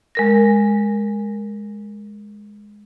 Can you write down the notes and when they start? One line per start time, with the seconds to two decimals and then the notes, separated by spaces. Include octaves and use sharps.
0.15 G#3 A#4 A#6